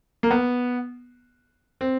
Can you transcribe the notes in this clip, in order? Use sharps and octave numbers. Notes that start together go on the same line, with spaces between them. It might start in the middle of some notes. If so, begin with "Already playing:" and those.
A#3
B3
C4